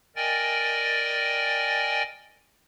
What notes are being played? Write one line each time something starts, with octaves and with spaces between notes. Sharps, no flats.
A#4 D5 D#5 G5 G#5 A6